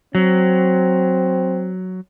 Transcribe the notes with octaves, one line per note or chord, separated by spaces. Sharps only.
F#3 C4